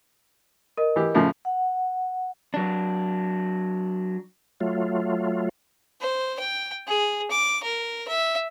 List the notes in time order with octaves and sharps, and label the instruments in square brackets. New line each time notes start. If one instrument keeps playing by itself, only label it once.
[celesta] A#4 D#5
[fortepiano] E3 G4
A2 C#3 F3
[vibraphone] F#5
[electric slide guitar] F#3 D4
[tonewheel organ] F#3 A3 F4
[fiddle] C5
G5
G#4
D6
A#4
E5